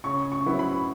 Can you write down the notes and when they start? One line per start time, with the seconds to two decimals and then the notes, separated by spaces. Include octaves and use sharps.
0.04 C#3 C#6
0.32 C#6
0.46 F#3 B3 E4
0.59 B5